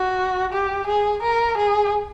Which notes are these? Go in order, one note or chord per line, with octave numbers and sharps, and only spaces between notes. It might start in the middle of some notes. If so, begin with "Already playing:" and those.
Already playing: F#4
G4
G#4
A#4
G#4